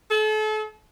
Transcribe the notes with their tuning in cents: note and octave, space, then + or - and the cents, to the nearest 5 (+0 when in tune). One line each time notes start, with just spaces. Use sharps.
A4 -35